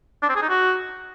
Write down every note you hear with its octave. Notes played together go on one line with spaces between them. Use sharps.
D4
C4
G#4
D#4
F#4